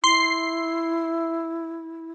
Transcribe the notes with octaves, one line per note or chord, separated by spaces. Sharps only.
E4 C6 C7